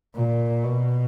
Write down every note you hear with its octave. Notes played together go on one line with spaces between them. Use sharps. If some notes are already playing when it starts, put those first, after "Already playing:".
A#2
B2